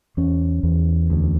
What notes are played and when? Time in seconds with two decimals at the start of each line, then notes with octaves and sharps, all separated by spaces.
0.17 E2 C#4
0.63 E2
1.10 D2